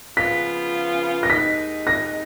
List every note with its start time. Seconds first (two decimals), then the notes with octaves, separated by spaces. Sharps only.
0.17 C#3 F3 B3 F4 B6
1.23 A#6
1.30 D#2 D#3 G#3 D#4 B6
1.87 A#6